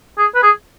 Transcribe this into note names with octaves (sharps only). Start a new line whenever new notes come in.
G#4
B4
G#4